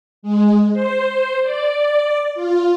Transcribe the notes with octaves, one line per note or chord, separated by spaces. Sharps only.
G#3
C5
D5
F4